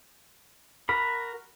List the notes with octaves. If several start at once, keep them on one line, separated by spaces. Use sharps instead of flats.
F#4 A#4 B5